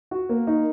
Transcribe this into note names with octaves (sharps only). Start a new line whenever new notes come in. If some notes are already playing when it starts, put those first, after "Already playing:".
F#4
A#3
D#4